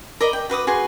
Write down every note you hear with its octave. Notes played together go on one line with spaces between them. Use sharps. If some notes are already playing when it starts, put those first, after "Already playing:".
A#4 D5 D#5 B5
G5
F#4 B4 D6 D#6
F#4 G#4 B4 C6